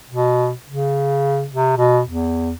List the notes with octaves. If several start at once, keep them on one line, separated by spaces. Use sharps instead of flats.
B2
C#3
C3
B2
E2